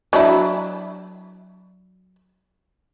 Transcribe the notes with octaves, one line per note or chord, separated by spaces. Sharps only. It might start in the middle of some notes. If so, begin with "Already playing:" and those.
F#3 D4 E4